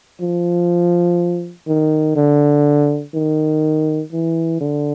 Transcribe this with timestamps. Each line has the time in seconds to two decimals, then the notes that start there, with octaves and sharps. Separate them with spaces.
0.21 F3
1.67 D#3
2.16 D3
3.14 D#3
4.12 E3
4.61 D3